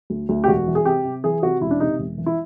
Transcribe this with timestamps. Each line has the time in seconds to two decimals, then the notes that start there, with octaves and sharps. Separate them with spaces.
0.10 D2
0.29 D2
0.44 G4
0.48 E1 F#4
0.67 E3
0.75 G#4
0.85 C3 G4
1.05 C3
1.24 E3 G#4
1.42 C3 F#4
1.61 E1 E4
1.71 D4
1.80 C3 D#4
1.99 E1
2.18 E3
2.26 E4